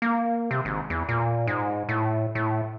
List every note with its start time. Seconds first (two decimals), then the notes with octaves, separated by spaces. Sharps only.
0.02 A#3
0.51 C3
0.65 G#1
0.90 E2
1.09 A#2
1.47 G#2
1.89 A2
2.35 A2